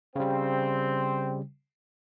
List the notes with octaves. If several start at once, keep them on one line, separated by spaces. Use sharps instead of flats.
C#3 G3 C4